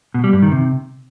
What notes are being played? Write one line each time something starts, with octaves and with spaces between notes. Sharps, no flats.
B2
G3
G2
D#3
C3